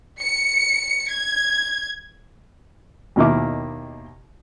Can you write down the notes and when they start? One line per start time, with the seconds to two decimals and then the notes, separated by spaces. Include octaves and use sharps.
0.19 C#7
1.10 G#6
3.16 D#2 B2 D#3 A#3 E4 D6